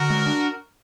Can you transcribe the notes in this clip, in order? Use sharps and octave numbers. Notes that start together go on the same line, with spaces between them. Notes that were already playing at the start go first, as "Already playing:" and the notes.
Already playing: D3 F#4 A#4
G#3
D4